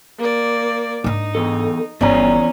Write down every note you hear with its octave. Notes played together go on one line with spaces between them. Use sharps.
A#3 D5
G#2 D4 D#4
E2 A4
G1 E2 C#4 D4 D5 A#5